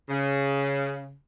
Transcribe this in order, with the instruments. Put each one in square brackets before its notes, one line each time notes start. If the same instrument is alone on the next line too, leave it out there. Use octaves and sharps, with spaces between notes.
[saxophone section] C#3